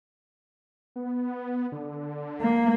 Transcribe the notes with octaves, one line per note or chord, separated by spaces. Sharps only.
B3
D3
A#3